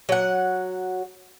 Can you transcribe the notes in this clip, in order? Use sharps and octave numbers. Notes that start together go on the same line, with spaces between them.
F#3 F#5